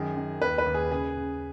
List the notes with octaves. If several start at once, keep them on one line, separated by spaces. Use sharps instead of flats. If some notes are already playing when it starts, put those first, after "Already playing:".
Already playing: F#2 D#3 G#4
D#3
D#2 B4
B4
D#2
G#4
C#3 G#4
C#3